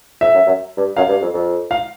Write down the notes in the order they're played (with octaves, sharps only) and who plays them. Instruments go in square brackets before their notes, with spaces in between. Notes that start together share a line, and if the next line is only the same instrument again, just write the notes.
[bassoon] F2 [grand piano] E5
[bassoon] F#2
F#2
G2
[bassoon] F#2 [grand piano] F5
[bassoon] G2
F2
F2
[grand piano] F5